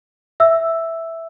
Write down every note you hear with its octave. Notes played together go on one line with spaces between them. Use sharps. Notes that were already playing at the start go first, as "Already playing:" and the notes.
E5 E6